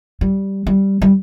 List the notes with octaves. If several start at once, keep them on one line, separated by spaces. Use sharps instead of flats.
G3
G3
G3